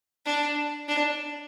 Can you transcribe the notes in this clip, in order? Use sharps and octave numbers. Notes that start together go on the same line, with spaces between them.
D4
D4